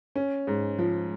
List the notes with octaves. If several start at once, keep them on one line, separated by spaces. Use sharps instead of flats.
C#4
G#2
F3